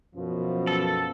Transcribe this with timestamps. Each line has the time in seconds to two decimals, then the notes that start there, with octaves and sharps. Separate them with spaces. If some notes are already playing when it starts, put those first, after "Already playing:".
0.15 F#2 B2 F3
0.67 A4